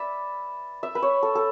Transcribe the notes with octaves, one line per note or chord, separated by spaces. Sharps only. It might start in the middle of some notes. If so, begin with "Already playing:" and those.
Already playing: B4 D5 E5
E5
B4
C#5
A4
A4